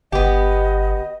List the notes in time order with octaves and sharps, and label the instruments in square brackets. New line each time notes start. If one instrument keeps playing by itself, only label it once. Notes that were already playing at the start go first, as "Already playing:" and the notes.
[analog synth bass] G1 [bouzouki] B3 G4 [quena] D#5